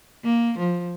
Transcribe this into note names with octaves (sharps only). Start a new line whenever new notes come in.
A#3
F3